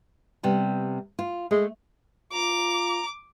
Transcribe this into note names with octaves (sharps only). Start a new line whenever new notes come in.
C3 G3 B3
F4
G#3 A3
F4 A#5 D6